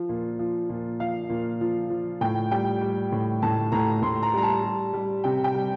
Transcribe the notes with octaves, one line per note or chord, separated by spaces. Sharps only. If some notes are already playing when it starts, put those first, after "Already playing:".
Already playing: F3
A#2
F3
A#2
F3 F5
A#2
F3
F3
A2 G5
G3 G5
G3
A2
A2 A5
A2 A#5
A2 C6
A#5
G3 A#5
A5
G3
G3
C3 G5
G5
G3